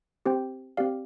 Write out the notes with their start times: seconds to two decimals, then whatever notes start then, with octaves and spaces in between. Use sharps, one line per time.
0.25 C4 G4 C5 G5
0.77 C4 G4 D5 F5